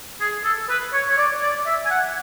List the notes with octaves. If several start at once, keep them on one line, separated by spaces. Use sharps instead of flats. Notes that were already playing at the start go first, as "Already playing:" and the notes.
G#4
A4
B4
C#5
C#5
D5
D5
E5
G#5
F#5